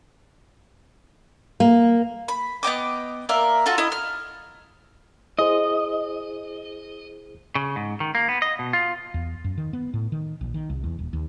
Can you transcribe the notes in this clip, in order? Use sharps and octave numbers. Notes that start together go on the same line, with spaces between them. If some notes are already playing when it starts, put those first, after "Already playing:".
A#3
B5
B3 D#5 G5 D6
A#3 A#4 D5 E5
F4 F#4 A4
E4 D#5
F6
E4 G#4 C5 D#5
C#3
G#2
D#3
A#3
B3
D#5
B2
F4
E2
F#2
D#3
B3
A2
D#3
A#1
D#3
C2
E2
D#1
D#2